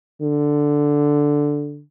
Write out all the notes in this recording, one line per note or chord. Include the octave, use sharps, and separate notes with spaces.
D3